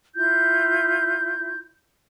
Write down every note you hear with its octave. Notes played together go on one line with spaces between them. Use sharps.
E4 F4 G6